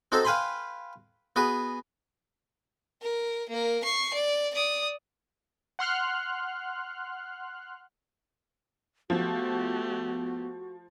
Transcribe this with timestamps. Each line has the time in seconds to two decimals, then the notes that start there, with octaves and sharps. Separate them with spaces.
0.12 C4 D#4 F#4 A4 C5
0.25 B4 F5 G5 G#5 B5 C6
1.36 B3 F#4 G#4 B4
3.02 A#4
3.50 A#3 A#4
3.84 C#6 C7
4.14 D5
4.55 D5 D#6
5.79 F#5 C6 F6 F#6
9.10 F3 A3 B3 F#4 G4